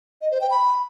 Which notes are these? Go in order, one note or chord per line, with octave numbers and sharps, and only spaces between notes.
D#5
C5
G5
B5